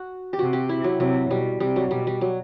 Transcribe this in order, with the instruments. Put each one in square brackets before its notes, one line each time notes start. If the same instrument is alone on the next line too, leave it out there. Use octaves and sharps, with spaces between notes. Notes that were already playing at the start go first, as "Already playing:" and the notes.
Already playing: [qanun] F#4
G4
[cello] C3 [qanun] F#4
[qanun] G4
E4
F#3
[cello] C3 [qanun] F#3
[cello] B2 [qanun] G3
[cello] C3 [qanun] G3
[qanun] F#3
[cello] B2 [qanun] G3
[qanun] G3
F#3